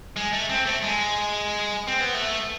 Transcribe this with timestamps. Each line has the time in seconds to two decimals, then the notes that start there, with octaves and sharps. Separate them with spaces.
0.16 G#3
0.33 A3
0.49 C4
0.66 A3
0.82 G#3
1.88 C4
2.00 B3
2.14 A3